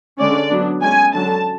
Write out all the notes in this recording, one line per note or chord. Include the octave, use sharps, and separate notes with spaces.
D3 G#3 C#4 D5
F#3 B3 D4
G#3 C#4 G#5
D3 F#3 C#4 A5